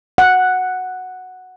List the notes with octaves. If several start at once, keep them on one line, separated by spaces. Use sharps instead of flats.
F#5